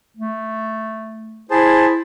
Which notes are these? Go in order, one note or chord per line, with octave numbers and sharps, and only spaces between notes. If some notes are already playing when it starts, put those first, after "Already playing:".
A3
E4 G#4 C5 A5